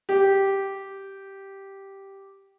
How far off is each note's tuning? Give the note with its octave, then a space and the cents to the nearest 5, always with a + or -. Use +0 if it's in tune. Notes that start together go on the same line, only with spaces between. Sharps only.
G4 -5